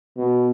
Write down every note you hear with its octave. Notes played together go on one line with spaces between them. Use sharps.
B2